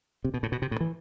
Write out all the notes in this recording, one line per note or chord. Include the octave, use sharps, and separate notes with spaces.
C3
B2
A2
B2
C3
A2
E3